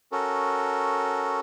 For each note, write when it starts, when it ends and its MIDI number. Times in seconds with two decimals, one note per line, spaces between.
0.12 1.40 61
0.12 1.40 66
0.12 1.40 69
0.12 1.40 70